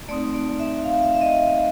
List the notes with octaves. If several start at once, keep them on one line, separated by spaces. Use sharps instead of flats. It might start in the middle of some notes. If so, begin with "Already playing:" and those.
A3 C4 D#4 D5
D5
E5
F5
E5
E5
D#5